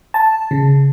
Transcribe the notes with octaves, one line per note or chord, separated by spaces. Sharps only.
A5
C#3